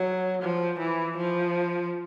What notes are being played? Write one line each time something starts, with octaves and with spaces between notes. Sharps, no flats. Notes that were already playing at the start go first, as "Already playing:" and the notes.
Already playing: F#3
F3
E3
F3